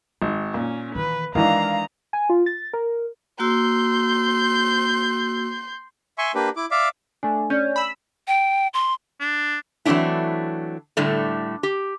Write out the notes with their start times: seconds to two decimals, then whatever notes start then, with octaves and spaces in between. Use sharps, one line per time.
0.22 G#1 G#3
0.54 A#2 C#4
0.95 D#3 E3 B4
1.35 D#3 E3 G#3 D4 E4 F5 A#5
2.13 G#5
2.30 F4
2.46 A6
2.73 A#4
3.39 A#3 F#4 C6 E6 G6
6.18 E5 G#5 C6 C#6
6.35 A#3 D4 G4 B4
6.56 E4 D6
6.71 D5 E5 F5 D6
7.23 A3 D4 G#5
7.50 C#4 D5 G6
7.76 B5 E6
8.28 G5
8.74 C6
9.20 D4
9.85 E3 F#3 A3 C4 D4 E4
10.97 A2 D3 G3 A3
11.63 G4